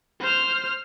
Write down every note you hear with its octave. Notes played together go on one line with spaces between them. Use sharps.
C5 F6